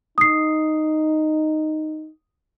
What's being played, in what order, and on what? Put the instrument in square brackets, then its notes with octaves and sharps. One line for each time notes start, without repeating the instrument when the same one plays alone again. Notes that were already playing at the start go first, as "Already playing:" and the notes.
[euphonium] D#4 [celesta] D#6 C7